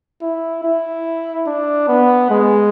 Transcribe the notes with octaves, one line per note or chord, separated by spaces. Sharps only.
E4
E4
D4
B3
G#3